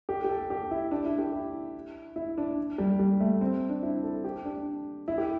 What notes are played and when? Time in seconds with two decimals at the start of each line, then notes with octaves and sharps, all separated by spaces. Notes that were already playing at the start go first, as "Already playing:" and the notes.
0.09 G4
0.24 G4
0.29 A4
0.50 G4
0.71 E4
0.91 D4
1.05 E4
1.18 G4
1.33 E4
2.16 E4
2.38 D4
2.78 G3
2.99 G3
3.20 A3
3.41 C4
3.69 D4
3.83 E4
4.03 A4
4.24 G4
4.45 D4
5.08 E4
5.18 G4